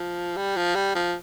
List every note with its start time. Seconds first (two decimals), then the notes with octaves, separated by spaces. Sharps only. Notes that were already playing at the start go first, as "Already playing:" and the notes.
Already playing: F3
0.37 G3
0.57 F3
0.75 G3
0.95 F3